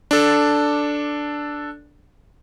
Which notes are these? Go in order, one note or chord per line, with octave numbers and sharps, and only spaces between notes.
D4 A4